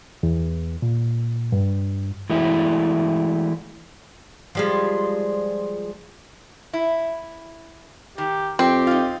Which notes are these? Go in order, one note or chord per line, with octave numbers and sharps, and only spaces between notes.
E2
A#2
G2
E3 G#3 A3 E4
F3 G3 G#3
E4
D#3 G4
F2 C4 G4
D#4 F4